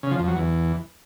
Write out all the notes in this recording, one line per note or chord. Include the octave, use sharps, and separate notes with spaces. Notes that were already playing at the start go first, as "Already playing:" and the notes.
C#3
F3
F2
F#3
E2